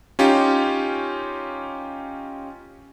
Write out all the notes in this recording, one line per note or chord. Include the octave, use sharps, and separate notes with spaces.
C#4 D#4 F4 G4